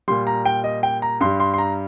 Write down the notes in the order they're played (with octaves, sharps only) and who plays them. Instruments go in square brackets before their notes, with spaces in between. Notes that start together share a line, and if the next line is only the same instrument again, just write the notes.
[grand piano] A#2 G3 C6
A#5
G5
D#5
G5
A#5
G2 G3 C6
C6
C6
A#5